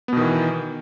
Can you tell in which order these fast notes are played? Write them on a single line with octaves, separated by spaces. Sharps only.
B3 B2 D#3 E3